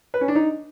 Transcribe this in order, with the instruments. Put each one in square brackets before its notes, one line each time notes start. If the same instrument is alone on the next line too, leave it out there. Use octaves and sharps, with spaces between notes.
[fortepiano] B4
C#4
D4
D#4